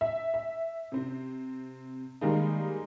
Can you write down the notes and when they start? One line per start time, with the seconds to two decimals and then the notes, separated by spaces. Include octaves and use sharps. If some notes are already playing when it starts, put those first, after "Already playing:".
0.01 E5
0.34 E5
0.92 C3 C4
2.21 D#3 G3 G#3 A#3 D#4